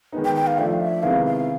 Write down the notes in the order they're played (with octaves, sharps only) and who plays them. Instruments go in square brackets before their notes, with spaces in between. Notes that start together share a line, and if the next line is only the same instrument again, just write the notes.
[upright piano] D#3 G#3 B3 D#4
[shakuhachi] G5
G5
F5
[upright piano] F3 A3 D4 [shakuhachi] E5
[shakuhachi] F5
E5
[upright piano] C3 D#3 G#3 B3 E4 [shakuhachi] F5
[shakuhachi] F5